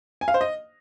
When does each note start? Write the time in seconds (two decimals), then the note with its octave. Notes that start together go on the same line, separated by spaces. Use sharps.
0.21 G#5
0.28 F5
0.34 C5
0.41 D#5